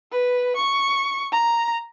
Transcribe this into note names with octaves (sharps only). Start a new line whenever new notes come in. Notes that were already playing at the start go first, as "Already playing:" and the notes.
B4
C#6
A#5